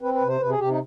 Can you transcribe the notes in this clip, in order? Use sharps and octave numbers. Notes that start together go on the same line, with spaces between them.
C4 B4
B4
C3
C5
C3 B4
G#4
C3 G4
D#4